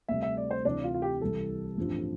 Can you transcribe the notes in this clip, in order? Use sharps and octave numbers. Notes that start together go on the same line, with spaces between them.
D2 C3 G3 E5
E5
D5
C5
D2 C3 E3 D4
F4
F4
G4
C2 C3 E3 A4
A1 G2 F3 C4